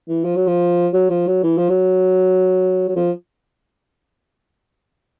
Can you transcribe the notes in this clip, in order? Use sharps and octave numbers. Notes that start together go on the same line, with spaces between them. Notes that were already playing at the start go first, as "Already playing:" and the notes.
E3
F3
F#3
F3
F#3
F3
F#3
E3
F3
F#3
F#3
F3